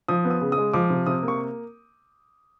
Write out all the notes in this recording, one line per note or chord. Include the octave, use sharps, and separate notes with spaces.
F3 D#6
B3
D#6
C#3
D#6
G#3
F3 D6
C3
C3 D#6
A#3
C#6